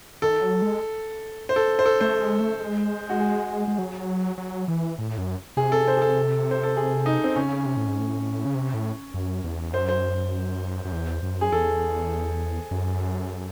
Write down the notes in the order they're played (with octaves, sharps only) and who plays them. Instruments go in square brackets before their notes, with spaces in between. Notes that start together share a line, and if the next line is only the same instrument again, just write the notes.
[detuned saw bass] D#3 [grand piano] A4
[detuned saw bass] F#3
G#3
[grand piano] C5
A4
C5
A4
[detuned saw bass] A3 [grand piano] C5
[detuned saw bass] G#3
A3
G#3
[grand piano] F#4
G#4
[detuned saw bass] G#3
F#3
F#3
E3
A2
F#2
[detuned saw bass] C3 [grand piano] G#4
[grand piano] A4
C5
G#4
A4
C5
A4
G#4
D#4
C4
[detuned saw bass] C#3 [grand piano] C#4
[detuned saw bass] C3
A2
G#2
A2
C#3
C3
A2
F#2
E2
[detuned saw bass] F#2 [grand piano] C5
[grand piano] C5
[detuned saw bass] F#2
E2
F#2
[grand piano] G#4
[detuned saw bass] E2 [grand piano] A4
[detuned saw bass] F#2